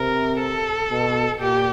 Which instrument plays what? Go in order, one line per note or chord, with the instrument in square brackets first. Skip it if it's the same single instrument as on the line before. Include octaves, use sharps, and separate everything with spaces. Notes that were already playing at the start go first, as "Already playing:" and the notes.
Already playing: [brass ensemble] C3 [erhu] A#4
[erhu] A4
[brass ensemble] B2
[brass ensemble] A#2 [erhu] G4